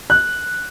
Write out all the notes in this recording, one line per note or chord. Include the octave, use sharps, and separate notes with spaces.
F#6